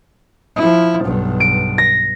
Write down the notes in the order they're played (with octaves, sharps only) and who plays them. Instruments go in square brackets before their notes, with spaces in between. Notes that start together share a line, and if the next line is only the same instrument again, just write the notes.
[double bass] F3 E4
B1 G2
[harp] D7
A#6